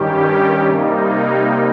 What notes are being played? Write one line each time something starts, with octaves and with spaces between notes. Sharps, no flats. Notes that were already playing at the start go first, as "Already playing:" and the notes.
Already playing: G2 D#3 G3 C#4 G4
C3 G3 A#3 D#4